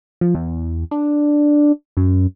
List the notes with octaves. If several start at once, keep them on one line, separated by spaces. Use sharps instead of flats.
F3
E2
D4
F#2